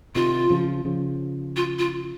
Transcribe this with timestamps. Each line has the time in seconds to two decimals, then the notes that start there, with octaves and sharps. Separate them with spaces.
0.15 C3 D#3 F4
0.50 C#3 F3
0.85 C#3 F3
1.56 F4
1.79 F4